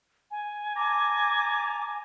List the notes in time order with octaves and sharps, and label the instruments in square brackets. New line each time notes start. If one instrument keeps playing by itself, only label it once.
[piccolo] G#5
[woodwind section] A5 A#5 D6